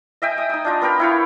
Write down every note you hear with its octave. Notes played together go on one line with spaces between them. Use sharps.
D#5 E5 G5 G#5
D#6
D#4 D#6
D4 F4 D#5
B3 A#4 G5 B5
E4 C#5 F5